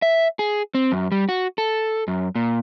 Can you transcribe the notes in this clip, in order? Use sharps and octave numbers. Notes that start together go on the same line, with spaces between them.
E5
G#4
C4
F#2
G3
F#4
A4
F#2
A#2